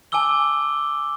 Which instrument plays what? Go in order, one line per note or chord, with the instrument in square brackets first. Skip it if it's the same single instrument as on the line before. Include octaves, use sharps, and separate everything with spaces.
[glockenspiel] G#5 A5 D6 E6 G7